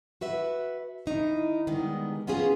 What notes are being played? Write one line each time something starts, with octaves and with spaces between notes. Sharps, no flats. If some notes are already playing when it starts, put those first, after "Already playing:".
F#4 B4 E5
D#3 D#4 E4
D#3 G3 G#3 B3
B3 C#4 F4 F#4 G#4